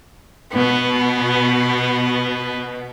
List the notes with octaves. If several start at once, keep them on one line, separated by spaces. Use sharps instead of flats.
B2 B3